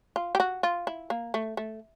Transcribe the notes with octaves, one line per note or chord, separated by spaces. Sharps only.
F4
G4
F#4
F4
E4
A#3
A3
A3